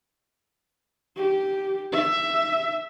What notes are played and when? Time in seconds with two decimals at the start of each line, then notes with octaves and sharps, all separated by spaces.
1.16 G4
1.92 E5